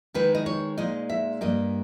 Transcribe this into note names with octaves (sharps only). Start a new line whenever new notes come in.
D#3 G#3 D#4 B4
D#5
C#5
A#2 G#3 D#4 D#5
E5
G2 G3 A#3 D#5